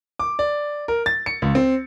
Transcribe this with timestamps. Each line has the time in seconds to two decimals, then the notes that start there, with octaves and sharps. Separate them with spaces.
0.19 D6
0.39 D5
0.88 A#4
1.06 A6
1.26 C#7
1.42 C#2
1.55 C4